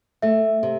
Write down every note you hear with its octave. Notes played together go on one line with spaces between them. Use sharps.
A3 E5
C3